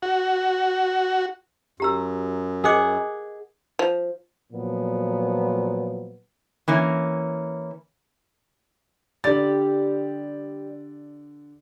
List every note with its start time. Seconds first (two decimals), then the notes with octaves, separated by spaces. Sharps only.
0.02 F#4
1.80 F#2 G4 A#5 E6
2.64 G#4 A#4 D#5 F#5 D6
3.79 F3
4.52 A#2 F3 F#3 B3
6.68 E3 A#3 C#4
9.24 D3 G3 D5 A6